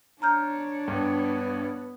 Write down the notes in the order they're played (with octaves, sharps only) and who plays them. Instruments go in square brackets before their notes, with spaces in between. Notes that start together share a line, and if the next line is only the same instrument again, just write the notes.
[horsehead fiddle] D4 C#5 [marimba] A#5 F6 G6
[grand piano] G2 [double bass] B3